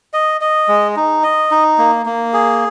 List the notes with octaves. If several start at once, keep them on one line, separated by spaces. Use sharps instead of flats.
D#5
D#5
G#3
D#4
D#5
D#4
A#3
A#3
G#4